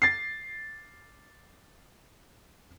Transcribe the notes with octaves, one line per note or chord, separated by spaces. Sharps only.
A6 C7